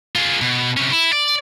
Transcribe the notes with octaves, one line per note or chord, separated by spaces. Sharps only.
F4 G#4
B2
C3 C#4
E4
D5